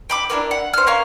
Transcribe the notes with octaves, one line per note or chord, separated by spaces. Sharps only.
G5 B5 D6
D4 E4 A#4 B4
F#5
C5 F6
A#3 C#4 F5